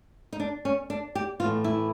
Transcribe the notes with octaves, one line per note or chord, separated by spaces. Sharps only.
D#4
D4
C#4
D4
G4
A2 E3 F4
E4